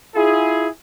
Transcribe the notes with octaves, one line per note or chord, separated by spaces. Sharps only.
E4 F4 G#4